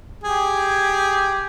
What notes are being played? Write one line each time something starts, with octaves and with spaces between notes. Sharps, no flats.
G4 G#4